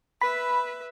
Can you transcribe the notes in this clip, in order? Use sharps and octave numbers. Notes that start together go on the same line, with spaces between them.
B4 E5 B5